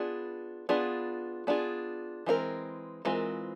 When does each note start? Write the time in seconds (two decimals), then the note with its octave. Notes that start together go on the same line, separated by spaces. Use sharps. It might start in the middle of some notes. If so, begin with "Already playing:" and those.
Already playing: B3 D4 F4 G#4
0.69 B3 D4 F4 G#4
1.47 B3 D4 F4 G#4
2.26 E3 G#3 C4 F4 A#4
3.05 E3 G#3 C4 F4 A#4